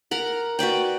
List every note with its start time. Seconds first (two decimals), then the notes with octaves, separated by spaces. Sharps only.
0.11 A#4 F#5
0.59 F#4 B4 D5 G5